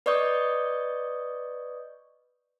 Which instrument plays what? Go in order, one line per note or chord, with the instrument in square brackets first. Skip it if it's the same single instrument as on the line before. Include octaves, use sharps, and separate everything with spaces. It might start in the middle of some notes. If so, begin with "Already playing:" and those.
[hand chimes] B4 D5 D#5 C#6 D#6 G6